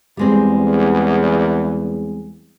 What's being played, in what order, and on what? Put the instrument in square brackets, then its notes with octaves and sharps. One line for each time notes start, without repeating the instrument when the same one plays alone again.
[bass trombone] E2 [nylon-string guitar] G3 G#3 C4